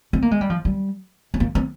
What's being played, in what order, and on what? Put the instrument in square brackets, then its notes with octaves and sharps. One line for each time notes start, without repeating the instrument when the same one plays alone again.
[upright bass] C4
A#3
G#3
G3
F3
G3
C4
A#3
C4